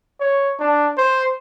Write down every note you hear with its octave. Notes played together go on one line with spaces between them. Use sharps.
C#5
D4
C5